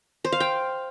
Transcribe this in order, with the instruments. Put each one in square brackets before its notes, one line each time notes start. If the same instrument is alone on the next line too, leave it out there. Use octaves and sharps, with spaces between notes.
[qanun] C5
F5
G5